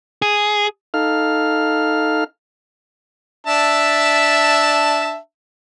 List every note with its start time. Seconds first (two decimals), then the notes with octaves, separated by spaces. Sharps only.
0.22 G#4
0.94 D#4 A4 F5 F6
3.46 D4 E5 A5